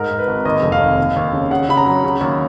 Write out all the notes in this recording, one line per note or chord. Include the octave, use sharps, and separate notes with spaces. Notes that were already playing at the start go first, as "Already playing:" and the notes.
Already playing: G#2 A#4
G#2
B4
G#1
D#2 D#5
F1
F5
D#2
D#2
D#2
C#3
C#3 F#5
C#3 B5
A#5
F#3
C#3
D#2